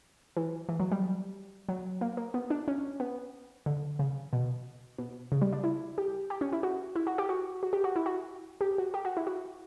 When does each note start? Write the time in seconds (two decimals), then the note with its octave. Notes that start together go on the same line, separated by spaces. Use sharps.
0.37 E3
0.69 E3
0.80 F#3
0.92 G3
1.69 F#3
2.01 A#3
2.17 A#3
2.34 B3
2.50 D4
2.68 C#4
3.00 B3
3.66 D3
3.99 C#3
4.33 B2
4.99 B2
5.32 C#3
5.42 G3
5.53 D4
5.64 E4
5.98 G4
6.30 G4
6.41 C#4
6.53 E4
6.63 F#4
6.96 E4
7.07 F#4
7.18 G4
7.29 F#4
7.63 F#4
7.73 G4
7.84 F#4
7.96 E4
8.06 F#4
8.61 G4
8.78 F#4
8.94 G4
9.05 F#4
9.17 E4
9.27 F#4